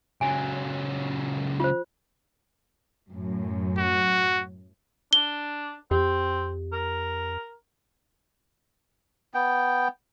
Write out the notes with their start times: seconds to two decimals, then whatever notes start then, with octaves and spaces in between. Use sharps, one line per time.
0.21 C#2 F#3 G#5
1.60 F4 C5
3.11 F#2 A2
3.78 F#4
5.13 D4 G7
5.91 F2 C4 G4
6.72 A#4
9.34 B3 G5